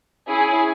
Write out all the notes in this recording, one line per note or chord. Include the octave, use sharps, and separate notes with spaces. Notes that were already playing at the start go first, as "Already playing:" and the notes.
C#4 E4 G#4 G#5